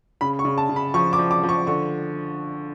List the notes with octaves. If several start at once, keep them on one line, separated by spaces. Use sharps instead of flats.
C#3 B5
C#6
C#3
A5
C#3
B5
F3 C#6
D6
F3
D6
F3
C#6
D3 C#6